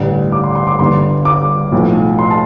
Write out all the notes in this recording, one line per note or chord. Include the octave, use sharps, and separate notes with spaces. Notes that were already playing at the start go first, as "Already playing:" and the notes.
Already playing: A1 G2 D3 G3
D6
C6
C6
D6
G1 G2 D3 C6
D6
B1 A2 F3
C6
A5